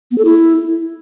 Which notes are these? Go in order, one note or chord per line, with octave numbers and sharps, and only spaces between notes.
B3
A4
E4